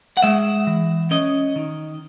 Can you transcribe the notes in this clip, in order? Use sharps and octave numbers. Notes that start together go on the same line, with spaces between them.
F#5
G#3 E5
E3
C#4 D#5
D#3